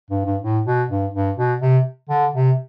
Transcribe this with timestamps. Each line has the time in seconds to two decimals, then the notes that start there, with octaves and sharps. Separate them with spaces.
0.11 G2
0.25 G2
0.42 A2
0.66 B2
0.90 G2
1.14 G2
1.38 B2
1.62 C3
2.10 D3
2.35 C3